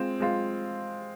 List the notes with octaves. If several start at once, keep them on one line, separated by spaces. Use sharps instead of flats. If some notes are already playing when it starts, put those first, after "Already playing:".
Already playing: G#3 C4 F4
G#3 C4 F4